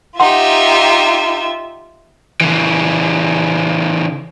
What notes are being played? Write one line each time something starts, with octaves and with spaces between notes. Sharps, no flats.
D#4 F4 G4 E5 F#5 C6
C#3 E3